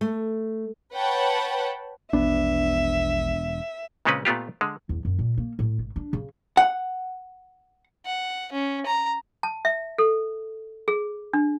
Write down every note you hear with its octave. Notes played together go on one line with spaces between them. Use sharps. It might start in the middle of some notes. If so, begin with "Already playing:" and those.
A3
B4 C#5 F#5 G5 A5 B5
E1 A#1 B3 D4 E5
A#2 C#3 G#3 C4 C#4 B4
A#2 A3 B3 F4 G4
D3 G#3
E2
F#2
A#2
A#3
A2
G#1
D4
C#3
F#5
F#5
C#4
A#5
A5
E5
A4
G#4
D4